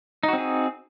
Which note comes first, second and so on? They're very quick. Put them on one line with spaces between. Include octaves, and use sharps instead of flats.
D#4 F#4 C4 G#4